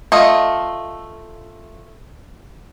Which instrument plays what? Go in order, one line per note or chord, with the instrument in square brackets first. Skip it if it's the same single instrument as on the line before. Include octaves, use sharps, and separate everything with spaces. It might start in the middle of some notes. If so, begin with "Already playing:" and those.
[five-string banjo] A3 F4 D#5